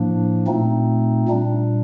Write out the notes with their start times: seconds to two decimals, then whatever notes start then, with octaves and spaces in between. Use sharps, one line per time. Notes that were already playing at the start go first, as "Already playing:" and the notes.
Already playing: A2 F3 A#3 D4
0.47 A#2 A3 C4 D#4
1.28 A#2 G3 D4